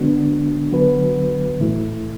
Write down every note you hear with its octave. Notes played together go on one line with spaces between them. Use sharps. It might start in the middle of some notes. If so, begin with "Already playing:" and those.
Already playing: D3 G#3 B3 D4 F#4
D3 F#3 B3 F#4 B4
A2 E3 A3 E4